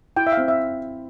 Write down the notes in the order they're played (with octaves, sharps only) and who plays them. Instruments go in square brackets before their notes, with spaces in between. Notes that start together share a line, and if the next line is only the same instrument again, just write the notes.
[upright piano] E4 [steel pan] G5
[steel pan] E5
[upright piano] C4 [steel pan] F5
[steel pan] E5